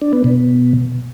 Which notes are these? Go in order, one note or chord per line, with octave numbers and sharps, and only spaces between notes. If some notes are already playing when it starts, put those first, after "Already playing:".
D4
B3
B2